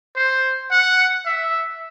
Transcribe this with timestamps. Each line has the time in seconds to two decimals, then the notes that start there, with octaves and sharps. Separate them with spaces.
0.16 C5
0.71 F#5
1.26 E5